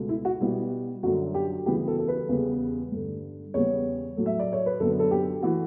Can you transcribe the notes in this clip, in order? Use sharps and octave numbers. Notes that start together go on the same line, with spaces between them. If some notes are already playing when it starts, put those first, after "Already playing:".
Already playing: C#2 B2 A3
E4
F#4
B2 G3 B3 E4
F#2 D3 F#3 F#4
G4
D2 C#3 E3 G3 B3 G4
A4
A4
B4
E2 C#3 G3 B3
G2 D3 A3
E2 C#3 G3 B3 C#5
A2 F#3 A3
E5
D5
C#5
B4
F#2 D3 F#3 B3 A4
A4
G4
E3 A3 F#4